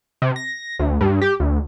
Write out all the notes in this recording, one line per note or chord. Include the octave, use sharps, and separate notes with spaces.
C3
A#6
D2
G2
G4
D2